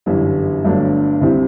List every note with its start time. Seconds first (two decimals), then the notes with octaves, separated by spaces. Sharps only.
0.06 G1 F#2 E3 G3
0.64 G1 G2 F#3 A3 D4
1.21 C2 C3 G3 C4 E4